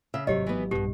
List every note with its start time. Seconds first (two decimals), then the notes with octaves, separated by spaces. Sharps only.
0.14 C#3 E5
0.27 G#1 C3 F#3 G4 C#5 D#5
0.46 E3 B3
0.71 B1 G2 B2 G4